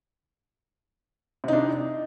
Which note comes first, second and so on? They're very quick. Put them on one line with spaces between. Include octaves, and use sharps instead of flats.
C3 D#4 D4